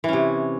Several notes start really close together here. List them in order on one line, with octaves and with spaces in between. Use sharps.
E3 C#4 C3